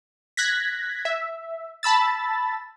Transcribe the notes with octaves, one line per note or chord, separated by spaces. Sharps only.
F#6 G#6 A#6 B6
E5
A5 B5 E6 A6